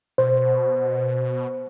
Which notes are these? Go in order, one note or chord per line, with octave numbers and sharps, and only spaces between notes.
B2 C5